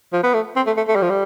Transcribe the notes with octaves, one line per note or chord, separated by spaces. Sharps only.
F3
B3
A3
C4
A3
A3
A3
G3
F3
G3